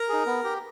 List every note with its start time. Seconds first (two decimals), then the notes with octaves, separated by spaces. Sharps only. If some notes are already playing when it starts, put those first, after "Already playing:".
Already playing: A#4 A#5
0.09 D#4 G#4
0.26 B3
0.44 G4